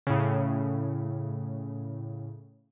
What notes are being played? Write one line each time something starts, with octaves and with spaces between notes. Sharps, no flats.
A2 C#3